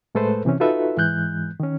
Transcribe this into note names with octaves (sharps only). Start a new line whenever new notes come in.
A2 G#3 A3 A4 B4 C5
C3 E3 C4 C#4
D#4 F4 F#4 A4 B4 E5
G#2 E3 G#3 F#6 G6
D#3 C#4